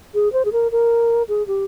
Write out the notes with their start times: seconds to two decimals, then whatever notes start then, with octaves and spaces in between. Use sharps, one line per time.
0.15 G#4
0.33 C5
0.45 G#4
0.53 A#4
0.72 A#4
1.29 G#4
1.47 G4